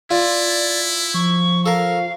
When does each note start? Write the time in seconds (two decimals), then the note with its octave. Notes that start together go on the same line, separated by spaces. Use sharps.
0.11 E4 F4 D5
1.14 F3 C#6
1.66 A4 A#4 F5